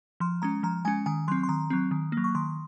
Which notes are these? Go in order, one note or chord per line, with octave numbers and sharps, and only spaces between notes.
F3 C6
G#3 C#4 A#5
F3 A#5
G#3 C#4 G#5
D#3 G#5
F#3 C4 C6
C6
D#3 A#5
F#3 C4
D#3
F#3 A#3
C#6
D#3 C6